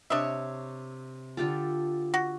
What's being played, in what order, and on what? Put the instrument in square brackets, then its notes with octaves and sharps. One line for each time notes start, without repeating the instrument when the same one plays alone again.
[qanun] C3 C#5 C#6 [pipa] D4 D#5 E5
[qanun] D3 G4 A4 [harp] F4
[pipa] F#4